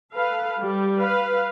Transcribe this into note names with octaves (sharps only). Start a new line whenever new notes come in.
A4 B4 F5
G3
B4 F5